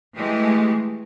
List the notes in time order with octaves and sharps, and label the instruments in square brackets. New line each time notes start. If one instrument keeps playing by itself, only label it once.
[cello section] E3 G#3 A3 G4